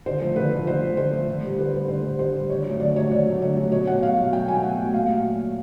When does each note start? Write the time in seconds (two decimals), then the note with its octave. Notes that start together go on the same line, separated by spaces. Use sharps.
0.06 D3 C5
0.21 F3 A3
0.36 D3 B4
0.51 F3 A3
0.66 D3 C5
0.82 F3 A3
0.97 D3 C5
1.12 F3 A3
1.28 D3
1.43 G3
1.59 D3 B4
1.73 G3 C5
1.88 D3 C5
2.04 G3
2.19 D3 C5
2.35 G3
2.50 D3 C#5
2.65 F#3
2.70 A3
2.80 D3 D5
2.95 F#3 A3 C#5
3.11 D3 D5
3.26 F#3 A3
3.42 D3 C#5
3.57 F#3 A3
3.72 B2 C#5
3.87 F#3 A3 F#5
4.03 B2 F5
4.17 F#3 A3
4.33 B2 G5
4.48 F#3 A3 G#5
4.63 B2 F#5
4.78 F#3 A3
4.94 A#2 F5
5.10 F#3 A3